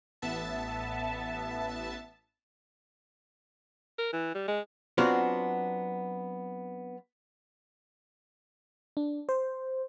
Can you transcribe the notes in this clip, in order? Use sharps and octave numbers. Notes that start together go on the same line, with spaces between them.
A1 B3 E5 A5
A#4
E3
G3
G#3
F#3 B3 C4 D4 F4 F#4
D4
C5